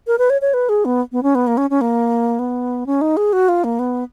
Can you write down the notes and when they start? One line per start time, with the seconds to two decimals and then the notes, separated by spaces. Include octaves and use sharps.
0.07 A#4
0.18 B4
0.30 C#5
0.42 C#5
0.54 B4
0.69 G#4
0.85 B3
1.12 B3
1.23 C#4
1.35 B3
1.47 A#3
1.57 C#4
1.70 C#4
1.81 A#3
2.39 B3
2.86 C#4
3.01 D#4
3.17 G#4
3.33 F#4
3.49 F4
3.64 A#3
3.79 B3